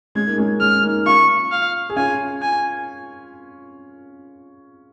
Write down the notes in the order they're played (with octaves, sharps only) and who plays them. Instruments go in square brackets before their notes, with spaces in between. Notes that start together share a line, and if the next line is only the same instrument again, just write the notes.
[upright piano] G#3 C#4 [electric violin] G#6
[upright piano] A#3 D#4
G#3 C#4
[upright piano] G#3 C#4 [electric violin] F6
[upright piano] A#3 D#4
[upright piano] C#4 F4 [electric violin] C#6
[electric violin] F5
[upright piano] G#4
[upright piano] C#4 F4 [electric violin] G#5
[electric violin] G#5